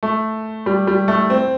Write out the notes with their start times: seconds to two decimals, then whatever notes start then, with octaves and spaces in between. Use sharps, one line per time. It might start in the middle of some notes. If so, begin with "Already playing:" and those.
0.03 A3
0.66 G3
0.87 G3
1.08 A3
1.30 C4